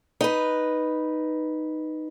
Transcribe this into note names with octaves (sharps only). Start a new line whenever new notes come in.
D#4 B4